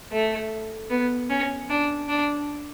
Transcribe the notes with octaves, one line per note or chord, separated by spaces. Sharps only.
A3
B3
C#4
D4
D4